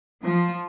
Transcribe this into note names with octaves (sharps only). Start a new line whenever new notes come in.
F3